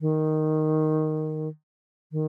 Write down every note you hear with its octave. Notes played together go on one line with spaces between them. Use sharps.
D#3
D#3